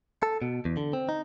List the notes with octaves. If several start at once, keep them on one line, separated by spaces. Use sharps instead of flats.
A4
B2
E2
D3
C4
D#4